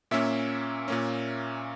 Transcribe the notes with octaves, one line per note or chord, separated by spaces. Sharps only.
A#2 A#3 C#4 E5
A#2 A#3 C#4